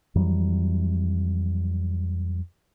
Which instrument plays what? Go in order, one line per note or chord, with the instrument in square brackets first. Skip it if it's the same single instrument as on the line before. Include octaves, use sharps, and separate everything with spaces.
[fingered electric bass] F2 E3 F#3 G3